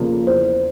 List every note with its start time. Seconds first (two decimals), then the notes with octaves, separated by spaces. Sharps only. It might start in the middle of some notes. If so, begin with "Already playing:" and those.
Already playing: E2 C#3 F3 A#3
0.27 E2 C5